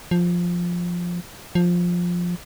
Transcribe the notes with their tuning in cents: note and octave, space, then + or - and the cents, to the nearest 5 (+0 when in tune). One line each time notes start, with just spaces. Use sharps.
F3 +5
F3 +10